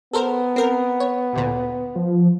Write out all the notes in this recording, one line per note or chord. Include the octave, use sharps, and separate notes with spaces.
B3 A4 A#4 C5
C4 A#4
C#5
A1 D2 A#2
F3